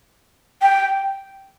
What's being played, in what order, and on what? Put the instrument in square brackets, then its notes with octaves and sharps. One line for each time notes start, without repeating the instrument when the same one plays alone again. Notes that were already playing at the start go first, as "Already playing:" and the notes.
[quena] G5